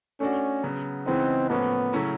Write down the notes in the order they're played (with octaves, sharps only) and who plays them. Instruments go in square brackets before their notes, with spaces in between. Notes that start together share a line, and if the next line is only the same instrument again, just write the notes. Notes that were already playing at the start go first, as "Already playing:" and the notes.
[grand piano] A3 D4 F#4 [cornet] C#4
[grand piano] C#3 F#3 B3
[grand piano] C#3 E3 G#3 B3 D#4 [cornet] C4
[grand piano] A2 F3 A#3 C#4 [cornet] B3
[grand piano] C#3 F#3 A3 C#4 E4